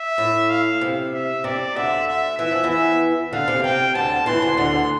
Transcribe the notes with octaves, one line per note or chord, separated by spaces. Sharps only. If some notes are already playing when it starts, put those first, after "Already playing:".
Already playing: E5
A2
F5
C3
E5
C3 D5
D2 D3 E5
E5
E3 E5
F3
E2 E3
E5
D2 D3 F5
C3
C3 G5
D2 D3 A5
E2 E3 C6
D2 D3
D2 D3 C6